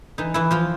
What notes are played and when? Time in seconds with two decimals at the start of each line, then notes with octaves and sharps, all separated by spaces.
0.18 E3 D#4
0.34 E3 E4
0.51 F3 F4